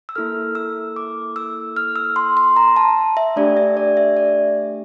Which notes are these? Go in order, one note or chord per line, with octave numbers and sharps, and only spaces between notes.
E6
A#3 E4 A4 F6
E6
D6
E6
F6
E6
C6
C6
A#5
A5
E5
A3 D4 G4 D5
E5
D5
E5
D5